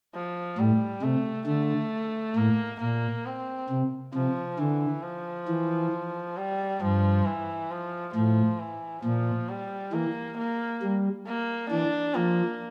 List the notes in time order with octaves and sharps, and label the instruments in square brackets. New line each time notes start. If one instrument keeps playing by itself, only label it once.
[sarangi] F3
[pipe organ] A2 [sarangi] G3
[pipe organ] C3 [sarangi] A3
[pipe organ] D3 [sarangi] A3
[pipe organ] A2 [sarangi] A#3
[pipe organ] A#2 [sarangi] A#3
[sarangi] C4
[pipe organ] C3
[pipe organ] C3 [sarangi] F3
[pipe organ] D3 [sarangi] E3
[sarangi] F3
[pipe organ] E3
[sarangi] G3
[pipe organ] G2 [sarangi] F3
[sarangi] E3
F3
[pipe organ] A2 [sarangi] F3
[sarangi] E3
[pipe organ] A#2 [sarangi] F3
[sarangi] G3
[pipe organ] E3 [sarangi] A#3
[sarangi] A#3
[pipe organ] G3
[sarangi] A#3
[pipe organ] E3 [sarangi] D4
[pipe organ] F3 [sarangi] A#3